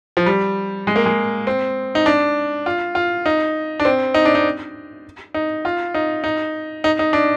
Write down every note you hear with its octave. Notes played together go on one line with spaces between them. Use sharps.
F3
G3
G#3
A#3
G#3
C4
D#4
D4
F4
F4
D#4
D4
C4
D#4
D4
D#4
D#4
F4
D#4
D#4
D#4
D#4
D4